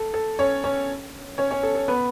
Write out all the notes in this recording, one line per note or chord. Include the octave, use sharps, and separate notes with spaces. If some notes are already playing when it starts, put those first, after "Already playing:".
Already playing: A4
A4
C#4 C#5
C#4 C#5
C#4 C#5
C#4 C#5
A4
A4
B3 B4